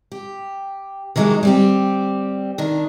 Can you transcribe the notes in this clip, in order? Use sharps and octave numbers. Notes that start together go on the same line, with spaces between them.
G4
D#3 E3 F#3 G#3 G4
G3 C4 G4
D#3 D4